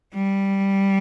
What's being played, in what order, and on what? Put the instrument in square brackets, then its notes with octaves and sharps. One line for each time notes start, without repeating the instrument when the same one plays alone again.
[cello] G3